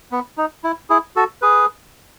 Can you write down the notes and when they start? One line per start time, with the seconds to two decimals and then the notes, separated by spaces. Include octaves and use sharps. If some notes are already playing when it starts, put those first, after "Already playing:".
0.12 B3
0.38 D#4
0.64 E4
0.90 E4 G#4
1.16 F#4 A4
1.42 G#4 B4